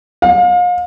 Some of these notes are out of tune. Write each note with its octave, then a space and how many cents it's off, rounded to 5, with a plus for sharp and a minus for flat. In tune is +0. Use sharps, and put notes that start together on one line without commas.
F5 +35